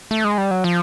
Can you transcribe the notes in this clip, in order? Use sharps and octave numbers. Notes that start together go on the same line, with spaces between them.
A3
G#3
G3
F#3
F3